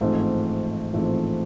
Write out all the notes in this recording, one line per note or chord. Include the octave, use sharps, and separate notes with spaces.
A1 G#2 F3 A3 C4
A1 G#2 F3 A3 C4